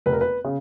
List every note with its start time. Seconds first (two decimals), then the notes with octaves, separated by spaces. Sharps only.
0.06 F1 B4
0.13 A#4
0.21 B4
0.45 C#3